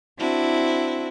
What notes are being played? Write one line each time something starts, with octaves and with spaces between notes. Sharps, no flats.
C4 D4 E4 F#4